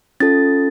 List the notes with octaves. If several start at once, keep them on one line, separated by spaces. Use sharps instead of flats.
C#4 F4 A4 A6